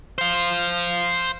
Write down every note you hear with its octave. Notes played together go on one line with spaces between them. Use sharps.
C5 F5